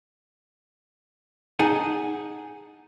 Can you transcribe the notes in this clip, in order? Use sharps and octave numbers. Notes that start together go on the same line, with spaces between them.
D#4 G#4 F#5 G#5 A5